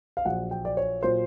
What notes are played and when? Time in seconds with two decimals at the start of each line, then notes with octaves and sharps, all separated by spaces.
0.17 F5
0.25 A#1 A#2 F#3 F#5
0.51 G5
0.65 D5
0.77 C#5
1.03 A#2 F#3 C5